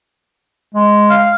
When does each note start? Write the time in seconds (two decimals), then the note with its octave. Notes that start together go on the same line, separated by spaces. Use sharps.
0.74 G#3
1.10 F5